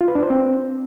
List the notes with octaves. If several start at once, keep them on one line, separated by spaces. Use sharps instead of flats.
F4
B4
D4
C5
C4